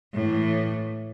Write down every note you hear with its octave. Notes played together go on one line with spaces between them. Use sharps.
A2 E3